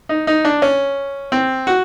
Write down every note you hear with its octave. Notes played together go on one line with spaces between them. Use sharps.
D#4
D#4
D4
C#4
C4
F#4